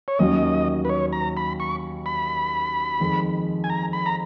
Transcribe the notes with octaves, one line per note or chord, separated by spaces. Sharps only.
C#5
D#2 D#3 F#3 A#3 C#4 D#5
B4
C#5
A#5
B5
C#6
B5
F2 D#3 G#3
G#5
A#5
B5
A#5